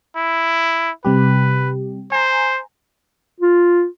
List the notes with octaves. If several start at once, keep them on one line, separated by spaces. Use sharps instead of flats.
E4
C3 G3 G4 B4
C5 G#5 A#5
F4